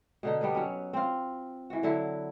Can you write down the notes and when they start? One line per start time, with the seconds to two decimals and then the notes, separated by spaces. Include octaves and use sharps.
0.23 B2 D3 D#4
0.41 G3 B3 D4 B4
0.55 F#3 C#4
0.93 C4 F4
1.70 E3 F#4
1.83 D3 F#3 E4